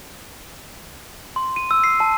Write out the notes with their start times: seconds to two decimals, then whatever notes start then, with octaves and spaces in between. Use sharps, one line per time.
1.36 C6
1.56 D#7
1.71 E6
1.84 C7
2.00 A5